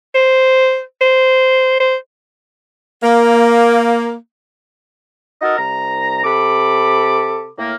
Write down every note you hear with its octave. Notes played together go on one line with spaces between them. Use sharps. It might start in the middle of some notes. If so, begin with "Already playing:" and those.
C5
C5
C5
A#3
D#4 F#4 A4 A#4 D#5
C2 A#5
C3 A4 B5 D6
A2 A#3